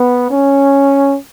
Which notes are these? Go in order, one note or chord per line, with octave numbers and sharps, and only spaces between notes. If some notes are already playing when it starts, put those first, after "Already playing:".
Already playing: B3
C#4